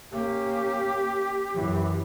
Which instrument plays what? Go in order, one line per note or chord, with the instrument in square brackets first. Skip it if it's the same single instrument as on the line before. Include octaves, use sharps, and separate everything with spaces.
[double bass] A#3 C#4 [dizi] G4
[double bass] F#2 E3